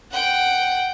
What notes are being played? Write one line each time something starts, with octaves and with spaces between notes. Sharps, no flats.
F#5 G5